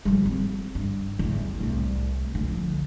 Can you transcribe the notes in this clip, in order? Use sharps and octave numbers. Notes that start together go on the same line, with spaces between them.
F3 G3
C4
G2
A1 E2
C2 A3
D3 F3